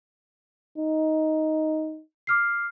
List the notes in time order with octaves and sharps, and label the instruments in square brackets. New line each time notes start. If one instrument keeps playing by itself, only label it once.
[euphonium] D#4
[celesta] D6 F6 C7